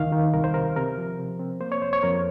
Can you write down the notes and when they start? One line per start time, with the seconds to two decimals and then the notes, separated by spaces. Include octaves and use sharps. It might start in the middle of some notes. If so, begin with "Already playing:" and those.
Already playing: D#2 D#3 F5
0.12 D#3
0.34 C2 A#4
0.44 C5
0.54 C3 A#4
0.76 C3 A#4
0.97 F3
1.18 C3
1.39 C4
1.61 A#3 C5
1.72 C#5
1.82 F2 C5
1.93 C#5
2.03 F2 A#4